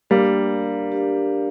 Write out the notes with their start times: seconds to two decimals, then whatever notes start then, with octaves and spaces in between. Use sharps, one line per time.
0.10 G3 A#3 D4 G4 A#4 D5 F5
0.91 D4 G4 A#4 D5 F5